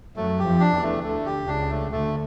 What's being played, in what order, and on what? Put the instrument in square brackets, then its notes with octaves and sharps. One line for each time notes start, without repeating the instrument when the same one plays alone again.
[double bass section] F#2 F#3 [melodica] A3
[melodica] G4
[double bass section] F2 F3
[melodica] D4
[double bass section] E2 E3
[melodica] A3
[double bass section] D2 D3 [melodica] A3
[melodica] G4
[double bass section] C#2 C#3 [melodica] D4
[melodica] A3
[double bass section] D2 D3 [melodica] A3